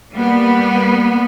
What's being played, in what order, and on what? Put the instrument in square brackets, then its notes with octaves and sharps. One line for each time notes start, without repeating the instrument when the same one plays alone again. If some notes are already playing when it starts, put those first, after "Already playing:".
[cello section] G3 A#3 B3